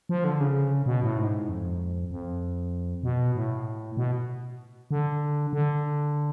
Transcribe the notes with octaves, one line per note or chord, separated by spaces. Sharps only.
F3
D3
C#3
B2
A2
G#2
F2
F2
B2
A2
B2
D3
D3